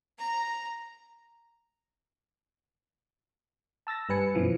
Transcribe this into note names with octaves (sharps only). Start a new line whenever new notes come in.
A#5
A5 E6 A6 A#6
G2 G3 B4 G#5 C#7
F#2 B2 E3 F3